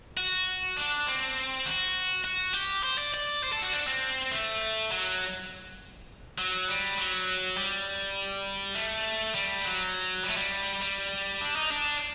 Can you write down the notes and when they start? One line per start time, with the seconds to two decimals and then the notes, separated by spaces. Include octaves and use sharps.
0.17 F#4
0.77 D4
1.07 C4
1.66 F#4
2.24 F#4
2.54 G4
2.83 C5
2.98 D5
3.14 D5
3.43 C5
3.53 A4
3.62 F#4
3.72 D4
3.87 C4
4.31 A3
4.91 F#3
6.38 F#3
6.69 G3
6.98 F#3
7.57 G3
8.75 A3
9.35 G3
9.64 F#3
10.24 G3
10.29 A3
10.37 G3
10.82 G3
11.41 D4
11.56 D#4
11.71 D4